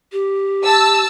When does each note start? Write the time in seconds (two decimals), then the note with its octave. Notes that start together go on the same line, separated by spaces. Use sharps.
0.12 G4
0.64 A5 E6